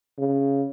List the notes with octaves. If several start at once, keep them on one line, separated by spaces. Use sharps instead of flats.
C#3